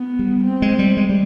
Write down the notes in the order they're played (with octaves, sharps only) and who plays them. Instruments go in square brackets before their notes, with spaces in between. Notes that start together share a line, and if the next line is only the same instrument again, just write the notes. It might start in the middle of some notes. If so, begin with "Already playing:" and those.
Already playing: [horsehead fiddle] B3
[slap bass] G3
[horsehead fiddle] C4
[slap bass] G#3
G3
G#3
G3